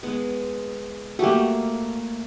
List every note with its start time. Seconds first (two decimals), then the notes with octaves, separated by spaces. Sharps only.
0.03 G#3 B3
1.19 A3 A#3 F#4 G4